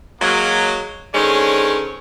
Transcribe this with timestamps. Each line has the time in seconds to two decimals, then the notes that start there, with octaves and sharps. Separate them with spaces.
0.21 F#3 G#3 A#3
1.14 D3 D#3 G#3 C4 C#4 C#5